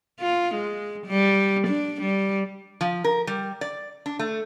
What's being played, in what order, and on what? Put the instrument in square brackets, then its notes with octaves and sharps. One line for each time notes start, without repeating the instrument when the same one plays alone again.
[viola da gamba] F4
G#3
G3
D4
G3
[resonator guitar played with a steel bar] F3
A#4
G3
D5
D4
A3